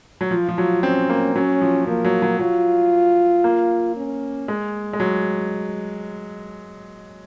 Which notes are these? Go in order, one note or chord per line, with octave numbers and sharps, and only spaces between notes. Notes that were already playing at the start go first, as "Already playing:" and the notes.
F#3
F3 F4
F3
F#3
C4 C#4
A#3
F#3 C#4
F3
F3 A#3
F#3
F#3
F#3 F4
A#3
C#4
G#3
G#3
F#3